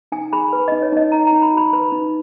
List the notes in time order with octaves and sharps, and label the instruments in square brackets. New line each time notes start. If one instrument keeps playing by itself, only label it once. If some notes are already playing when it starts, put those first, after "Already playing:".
[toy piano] D#4 G#5
G#4 B5
B4
D#4 D#5
C#5
D#4 D#5
D#4 A#5
A#5
D#4
B5
F#4 B5
B4 B5
D#4